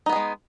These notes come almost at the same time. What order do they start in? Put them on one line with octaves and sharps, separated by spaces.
D#4 B3 G#4 G#3